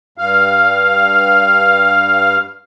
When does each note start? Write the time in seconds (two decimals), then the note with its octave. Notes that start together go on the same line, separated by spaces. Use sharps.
0.18 G2 F5